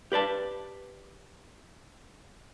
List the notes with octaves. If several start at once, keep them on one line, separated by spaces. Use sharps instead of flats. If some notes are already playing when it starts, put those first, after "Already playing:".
G4 B4 D5 A5